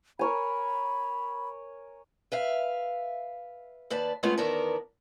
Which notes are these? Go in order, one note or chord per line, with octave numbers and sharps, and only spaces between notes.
A#4 C#5 G#5 B5
B4 E5 F5
D#2 B4 D5 A5
G#3 A3 B3 C#4 F4
E2 D#3 B3 A#4 D5 A5